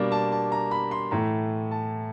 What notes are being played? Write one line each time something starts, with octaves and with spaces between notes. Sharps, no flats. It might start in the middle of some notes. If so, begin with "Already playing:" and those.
Already playing: B2 G3 A#3 D4
A5
A5
A#5
B5
C6
A2 E3 A3 A#5
A5